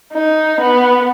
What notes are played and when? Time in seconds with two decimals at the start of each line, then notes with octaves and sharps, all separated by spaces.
0.13 D#4
0.60 B3